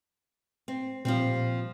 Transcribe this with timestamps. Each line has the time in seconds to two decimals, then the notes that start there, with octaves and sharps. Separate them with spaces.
0.68 C4
1.05 A#2 F3 G3 C4